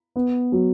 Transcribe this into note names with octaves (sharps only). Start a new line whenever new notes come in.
B3
F#3